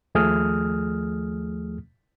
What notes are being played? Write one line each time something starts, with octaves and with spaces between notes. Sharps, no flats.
D#2 F3 A3 G#4 D#6 F6